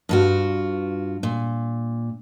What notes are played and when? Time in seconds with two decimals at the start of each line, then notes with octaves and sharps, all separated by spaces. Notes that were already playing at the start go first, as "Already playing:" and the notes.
0.09 G2 F4 F#4
1.23 A#2